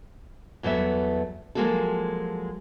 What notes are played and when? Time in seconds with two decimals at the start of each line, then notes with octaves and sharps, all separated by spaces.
0.63 E2 F#3 A3 B3 E5
1.55 F3 F#3 G#3 A#3 F#4 A4